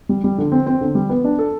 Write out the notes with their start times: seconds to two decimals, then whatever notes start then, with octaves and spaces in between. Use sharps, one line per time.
0.09 G3
0.24 G3
0.38 D3
0.52 C4
0.66 C4
0.81 D3
0.95 G3
1.09 B3
1.24 D4
1.39 A4